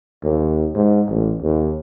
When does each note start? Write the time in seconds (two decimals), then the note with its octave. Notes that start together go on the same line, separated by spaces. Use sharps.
0.23 D#2
0.75 G#2
1.09 A1
1.42 D#2